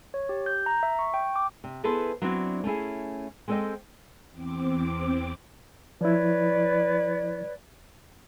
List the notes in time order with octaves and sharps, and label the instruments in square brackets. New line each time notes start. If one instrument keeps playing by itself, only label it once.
[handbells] C#5
G4
G6
A#5
E5
C#6
G5
D6
[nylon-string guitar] C3
B3 E4 G#4 A4 B4 C5
F#3 B3 C4 D4 E4 F#4
A3 C#4 E4 G#4
G#3 C4 A4 C5 D#5 G5
[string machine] E2 C4 D6
[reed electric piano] F3 E4 [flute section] B4 C#5 D5